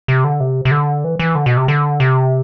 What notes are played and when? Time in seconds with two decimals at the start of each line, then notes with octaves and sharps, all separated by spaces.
0.08 C3
0.24 D3
0.40 C3
0.65 C3
0.71 D3
1.04 E3
1.19 E3
1.35 D3
1.46 B2
1.57 C3
1.68 D3
2.00 C3